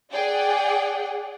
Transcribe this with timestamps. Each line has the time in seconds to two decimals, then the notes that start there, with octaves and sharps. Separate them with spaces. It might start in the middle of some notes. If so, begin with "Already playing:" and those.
0.12 G#4 D5 F#5 G5